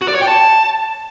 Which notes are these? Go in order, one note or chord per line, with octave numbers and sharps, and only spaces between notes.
F#4
D5
C#5
G5
A5